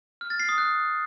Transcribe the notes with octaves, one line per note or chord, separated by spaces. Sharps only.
F6
A6
C7
D#6
F#6